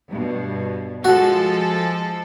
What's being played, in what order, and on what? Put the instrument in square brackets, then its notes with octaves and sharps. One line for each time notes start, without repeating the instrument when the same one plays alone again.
[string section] G2 B2
[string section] F3 G#3 A4 [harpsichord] F#4